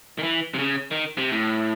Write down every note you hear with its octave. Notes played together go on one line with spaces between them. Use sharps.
D#3
E3
C3
C#3
D#3
C3
A2